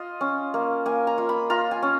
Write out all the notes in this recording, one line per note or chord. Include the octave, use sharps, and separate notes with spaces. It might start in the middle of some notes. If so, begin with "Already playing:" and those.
Already playing: F4 D#5
C#4
A#3
A#3 G#5
A#5
F4
B5
F4 A#5
G#5
C#4